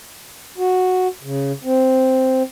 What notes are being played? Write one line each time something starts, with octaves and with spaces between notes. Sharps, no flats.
F#4
C#3
C4